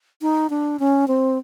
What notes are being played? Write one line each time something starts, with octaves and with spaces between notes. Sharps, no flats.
D#4
D4
C#4
C4